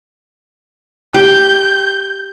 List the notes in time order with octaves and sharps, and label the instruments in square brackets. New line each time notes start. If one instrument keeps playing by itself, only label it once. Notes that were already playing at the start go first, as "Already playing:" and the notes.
[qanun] G4 [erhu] G6